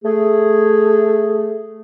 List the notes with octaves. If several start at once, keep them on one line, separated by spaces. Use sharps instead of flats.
A3 G#4